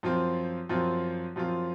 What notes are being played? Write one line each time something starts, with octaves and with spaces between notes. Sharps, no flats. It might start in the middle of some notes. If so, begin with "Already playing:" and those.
F#2 F3 C4 F4
F#2 F3 C4 F4
F#2 F3 C4 F4